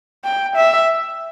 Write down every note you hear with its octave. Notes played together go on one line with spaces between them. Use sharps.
G5
E5